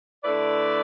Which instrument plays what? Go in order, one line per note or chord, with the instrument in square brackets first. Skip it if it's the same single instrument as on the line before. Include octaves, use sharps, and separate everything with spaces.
[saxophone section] D3 A3 E4 B4 D5